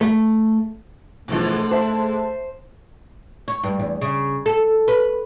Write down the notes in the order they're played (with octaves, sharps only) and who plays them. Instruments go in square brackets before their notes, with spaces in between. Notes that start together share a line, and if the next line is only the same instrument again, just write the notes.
[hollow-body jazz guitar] A3
[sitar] G#2 D3 [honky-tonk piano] B2 E3 F3 [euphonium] A3
[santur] C5 [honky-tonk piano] E5 A5
[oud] C#5
G2
E2
C#3
A4
B4